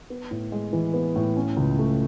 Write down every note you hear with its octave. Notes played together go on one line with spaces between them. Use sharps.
B3
A2
G#3
E3
B3
A2
C#4
C#2
A3